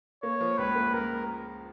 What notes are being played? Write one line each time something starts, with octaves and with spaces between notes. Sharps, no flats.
A#3 C#5
F3
C#2 B4
A#3
C#2 A#4